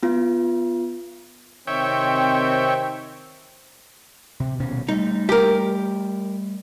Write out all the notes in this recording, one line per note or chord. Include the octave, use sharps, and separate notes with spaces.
B3 F4
C3 D#3 C4 C#5 E5 G5
C3
D#1 B2 C#4
G3 A3 D#4
G4 A#4